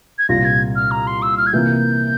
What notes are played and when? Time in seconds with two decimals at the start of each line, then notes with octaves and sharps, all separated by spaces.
0.19 G#6
0.29 C2 A#2 G3 C4 F4 A#6
0.45 G#6
0.76 F6
0.91 A#5
1.07 C6
1.22 E6
1.37 F6
1.47 G#6
1.53 C3 E3 A#3 F4 G6